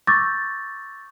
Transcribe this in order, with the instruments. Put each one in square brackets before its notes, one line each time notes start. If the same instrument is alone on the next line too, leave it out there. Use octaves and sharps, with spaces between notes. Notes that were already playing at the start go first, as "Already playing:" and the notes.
[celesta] C#6 D6 E6 G6 A6 A#6